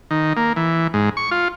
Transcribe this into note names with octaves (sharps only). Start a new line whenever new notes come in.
D#3
A#3
E3
G#2
C#6
F4